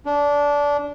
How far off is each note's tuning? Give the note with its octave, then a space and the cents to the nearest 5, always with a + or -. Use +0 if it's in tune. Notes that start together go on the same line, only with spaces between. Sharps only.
D4 -20